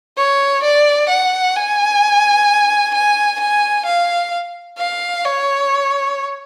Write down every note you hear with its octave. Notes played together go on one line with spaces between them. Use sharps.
C#5
D5
F#5
G#5
G#5
G#5
F5
F5
C#5